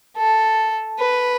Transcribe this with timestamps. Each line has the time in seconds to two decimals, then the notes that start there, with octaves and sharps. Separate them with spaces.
0.17 A4
0.98 B4